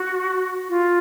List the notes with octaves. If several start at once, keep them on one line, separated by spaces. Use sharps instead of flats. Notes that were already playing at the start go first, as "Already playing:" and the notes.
Already playing: F#4
F4